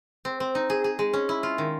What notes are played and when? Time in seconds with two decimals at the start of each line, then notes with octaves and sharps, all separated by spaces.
0.25 C4
0.40 C4
0.55 D#4
0.70 G#4
0.84 G#4
0.99 G#3
1.13 C#4
1.29 E4
1.43 F4
1.58 D#3